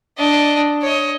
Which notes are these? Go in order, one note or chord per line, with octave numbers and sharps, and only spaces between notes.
D4 D#5
C#5 D#5